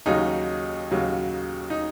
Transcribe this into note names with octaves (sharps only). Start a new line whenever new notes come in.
D#2 C#3 F#3 D#4
D#2 C#3 F#3
D#4